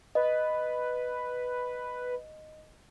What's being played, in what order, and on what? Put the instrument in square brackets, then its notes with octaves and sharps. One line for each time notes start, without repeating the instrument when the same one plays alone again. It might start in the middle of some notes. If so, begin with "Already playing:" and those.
[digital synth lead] B4 [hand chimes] D#5